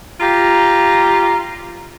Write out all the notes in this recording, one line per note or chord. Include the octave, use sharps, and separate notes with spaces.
F4 G4 A#5